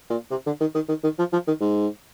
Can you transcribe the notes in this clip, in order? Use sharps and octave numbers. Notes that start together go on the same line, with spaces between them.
A#2
C3
D3
D#3
D#3
D#3
D#3
F3
F3
D#3
G#2